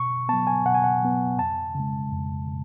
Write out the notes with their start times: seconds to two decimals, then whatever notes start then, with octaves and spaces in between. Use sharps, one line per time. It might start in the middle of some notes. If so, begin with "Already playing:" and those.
Already playing: B2 C#6
0.29 F#3 B3 A5
0.47 G#5
0.65 B2 F#5
0.74 G#5
0.84 F#5
1.02 F#3 B3
1.39 F2 A5
1.75 C#3 G#3
2.12 F2
2.49 C#3